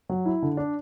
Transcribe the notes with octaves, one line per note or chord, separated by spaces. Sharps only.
F#3
E4
D3
D4